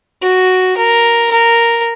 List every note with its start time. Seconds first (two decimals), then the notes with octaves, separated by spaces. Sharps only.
0.22 F#4
0.77 A#4
1.31 A#4